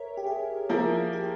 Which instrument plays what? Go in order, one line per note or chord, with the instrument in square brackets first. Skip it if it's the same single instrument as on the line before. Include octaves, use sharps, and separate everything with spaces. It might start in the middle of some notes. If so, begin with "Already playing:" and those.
Already playing: [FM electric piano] A#4 C#5 E5
G4
G#4
[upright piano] F3 A#3 E4 A#4 [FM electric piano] G#4
[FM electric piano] G4